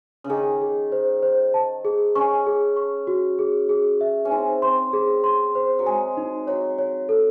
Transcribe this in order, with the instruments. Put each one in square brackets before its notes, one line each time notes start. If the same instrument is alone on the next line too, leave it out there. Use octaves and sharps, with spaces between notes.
[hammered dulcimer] C#3
[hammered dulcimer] D#3 [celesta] G#4
[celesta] G#4
C5
C5
A5
G#4
[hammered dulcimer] C#4 [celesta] C#6
[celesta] G#4
C#6
F#4
G#4
G#4
E5
[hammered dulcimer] C#4
[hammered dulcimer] C4 [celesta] D#4
[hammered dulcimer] C4 [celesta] C6
[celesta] G#4
C6
C5
[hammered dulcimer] F#3
[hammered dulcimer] G#3 [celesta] G#5
[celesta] D#4
[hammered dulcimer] F#3 [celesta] C#5
[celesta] C#5
A4